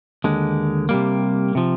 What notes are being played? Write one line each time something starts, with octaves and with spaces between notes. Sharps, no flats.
D#2 D3 G#3
C3 G3 A#3
C3 F3